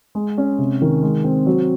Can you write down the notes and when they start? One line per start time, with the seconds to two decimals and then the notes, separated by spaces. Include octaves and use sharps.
0.15 G#3
0.38 C#4
0.59 C3
0.82 D#3
1.03 G#3
1.24 C4
1.46 F#3